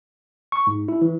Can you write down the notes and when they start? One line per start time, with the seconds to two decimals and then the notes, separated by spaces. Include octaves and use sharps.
0.52 C#6
0.67 G#2
0.88 E4
1.02 E3